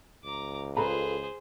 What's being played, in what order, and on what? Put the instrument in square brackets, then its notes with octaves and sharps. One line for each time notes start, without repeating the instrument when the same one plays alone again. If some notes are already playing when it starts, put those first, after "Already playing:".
[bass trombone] C#2 [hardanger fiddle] A#5 D6
[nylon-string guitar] F4 A4 B4 [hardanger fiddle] G#4 C5 [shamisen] D#5 A#5 B5